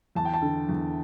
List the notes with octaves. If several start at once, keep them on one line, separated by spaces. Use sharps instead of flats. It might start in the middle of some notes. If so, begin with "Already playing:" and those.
E2 A5
G5
A5
D3
E2